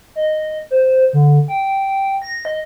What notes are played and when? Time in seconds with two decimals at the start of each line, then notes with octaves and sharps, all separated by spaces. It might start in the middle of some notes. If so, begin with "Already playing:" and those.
0.15 D#5
0.71 C5
1.13 D3
1.48 G5
2.22 A#6
2.45 D#5